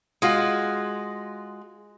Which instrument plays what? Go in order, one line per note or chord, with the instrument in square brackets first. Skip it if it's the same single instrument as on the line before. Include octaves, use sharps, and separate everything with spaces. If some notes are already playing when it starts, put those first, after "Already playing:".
[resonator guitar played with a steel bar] G#3 F4 F#4